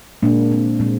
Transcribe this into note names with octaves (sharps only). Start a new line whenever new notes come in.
A#2 G#3 A#3 D4
C4
A#2 G#3 C4